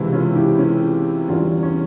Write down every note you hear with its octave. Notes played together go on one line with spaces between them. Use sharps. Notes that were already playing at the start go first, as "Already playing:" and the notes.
Already playing: C#2 C3 E3 E4
C#4 F4
E4 G4
C#4 F4
E2 E3 G3 C#4 F4
C#4